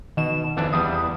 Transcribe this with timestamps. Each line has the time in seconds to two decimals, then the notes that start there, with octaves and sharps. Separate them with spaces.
0.17 B2 D#3 E7
0.57 F2 E3 D4
0.73 E2 G3 D#6